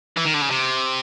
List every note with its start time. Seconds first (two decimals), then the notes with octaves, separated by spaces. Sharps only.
0.17 E3
0.25 D#3
0.34 D3
0.41 C#3
0.50 C3